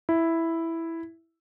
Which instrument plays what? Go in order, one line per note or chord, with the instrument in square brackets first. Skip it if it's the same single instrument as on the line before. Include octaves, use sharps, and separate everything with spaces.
[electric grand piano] E4